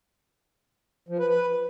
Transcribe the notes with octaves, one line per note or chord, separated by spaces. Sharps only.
F3
B4
B4